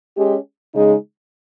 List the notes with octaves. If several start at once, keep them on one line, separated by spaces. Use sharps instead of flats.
G#3 C#4 G4
C#3 G#3 D#4 G#4